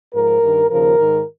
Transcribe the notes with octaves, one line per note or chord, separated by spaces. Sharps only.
G#2 F3 A#4
G2 D#3
D#2 C#3 F3 A#4
G#2 D#3